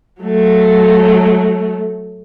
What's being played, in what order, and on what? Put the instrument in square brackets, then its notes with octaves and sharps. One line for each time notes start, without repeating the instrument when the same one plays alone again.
[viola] F#3 A3